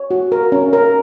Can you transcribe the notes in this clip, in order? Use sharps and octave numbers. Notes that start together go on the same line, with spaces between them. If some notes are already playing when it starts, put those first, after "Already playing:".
Already playing: C#5
F#4
A#4
C#4
A#4